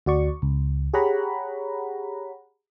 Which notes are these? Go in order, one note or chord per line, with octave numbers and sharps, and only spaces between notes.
D2 F#4 D5 C#6
C#2
G4 G#4 C#5 F#5 A#5 B5